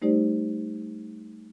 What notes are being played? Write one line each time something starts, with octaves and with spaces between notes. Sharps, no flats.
G3 A3 D#4 G4 C5 D5